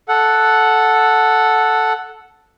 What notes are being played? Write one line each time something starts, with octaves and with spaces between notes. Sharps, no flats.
A4 F#5